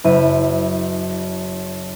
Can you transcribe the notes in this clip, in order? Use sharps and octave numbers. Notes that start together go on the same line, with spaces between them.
F#1 E4 E5 D#7